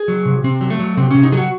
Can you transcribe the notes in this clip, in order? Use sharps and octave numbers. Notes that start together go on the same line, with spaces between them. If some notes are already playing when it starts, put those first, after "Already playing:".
Already playing: G#4
F#3
C3
C3 C4
F#3
A3
F#3
C3 C4
C3 C#4
D#4
F#3 G#4
F#4